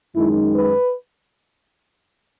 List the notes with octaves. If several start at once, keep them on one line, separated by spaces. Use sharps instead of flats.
F#2 D#3 G#3 D#4 E4
B4